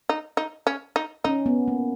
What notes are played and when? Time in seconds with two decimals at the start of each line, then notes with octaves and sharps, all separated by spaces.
0.09 D#4
0.37 D#4
0.67 C#4
0.96 D#4
1.24 C#4 D#4
1.46 B3
1.68 A#3